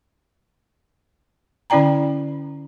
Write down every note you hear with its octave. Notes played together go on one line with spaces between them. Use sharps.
D3 C#4 E4 D5 G5 A#5